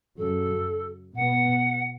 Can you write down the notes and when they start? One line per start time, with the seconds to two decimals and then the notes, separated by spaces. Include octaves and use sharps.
0.18 F#2 C#3 F#3 A4
1.15 B2 B3 F#5